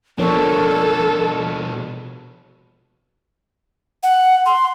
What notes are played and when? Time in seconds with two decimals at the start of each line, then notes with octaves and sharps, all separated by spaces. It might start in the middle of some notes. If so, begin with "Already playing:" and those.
0.19 B2 F3 D4 A4 A#4 C#5
4.03 F#5
4.46 C6